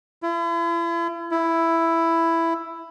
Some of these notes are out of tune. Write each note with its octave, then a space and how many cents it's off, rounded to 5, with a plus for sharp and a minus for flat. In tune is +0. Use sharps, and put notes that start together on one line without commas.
E4 +40
E4 +5